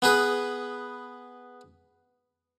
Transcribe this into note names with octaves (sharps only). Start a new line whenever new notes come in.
B3 G#4 B4